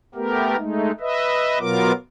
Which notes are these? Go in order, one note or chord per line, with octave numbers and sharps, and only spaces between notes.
A3 B3 G4 A#4
G#3 A3 D#4
B4 D#5 E5
B2 F#3 B3 F4 A#4 D6